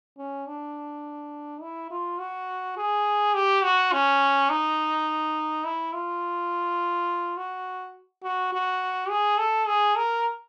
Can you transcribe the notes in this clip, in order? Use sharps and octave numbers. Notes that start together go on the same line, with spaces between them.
C#4
D4
E4
F4
F#4
G#4
G4
F#4
C#4
D#4
E4
F4
F#4
F#4
F#4
G#4
A4
G#4
A#4